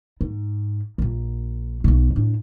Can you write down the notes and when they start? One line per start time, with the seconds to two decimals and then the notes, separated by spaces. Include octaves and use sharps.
0.21 G#2
0.98 A#1 A#2
1.84 B1 B2
2.16 A2 D4